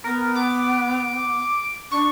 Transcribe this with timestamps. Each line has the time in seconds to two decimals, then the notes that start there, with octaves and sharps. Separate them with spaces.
0.04 B3 A#4
0.35 D6
1.91 D4 C#6